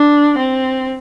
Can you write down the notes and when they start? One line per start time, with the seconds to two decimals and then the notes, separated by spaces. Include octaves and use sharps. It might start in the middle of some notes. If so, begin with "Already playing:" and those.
Already playing: D4
0.38 C4